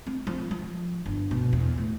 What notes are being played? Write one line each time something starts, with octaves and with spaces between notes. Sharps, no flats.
C4
F3
F3
G1
B2
E2
A2